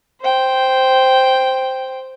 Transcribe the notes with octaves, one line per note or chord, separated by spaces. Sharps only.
C5 G5